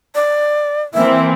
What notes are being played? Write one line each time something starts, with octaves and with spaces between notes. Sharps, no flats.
D5
E3 A#3 C4 E5